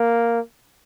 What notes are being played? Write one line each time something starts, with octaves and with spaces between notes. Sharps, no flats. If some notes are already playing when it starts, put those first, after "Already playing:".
Already playing: A#3